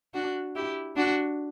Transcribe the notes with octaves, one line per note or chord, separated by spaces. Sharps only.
D4 F#4
E4 G4
D4 F#4